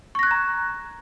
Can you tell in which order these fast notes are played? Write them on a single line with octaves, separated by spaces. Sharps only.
C#6 A#6 F#6 G#6 A#5